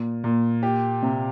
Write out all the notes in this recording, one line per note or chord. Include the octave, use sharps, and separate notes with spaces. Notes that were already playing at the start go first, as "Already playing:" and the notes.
Already playing: A#2
A#2
G4
C3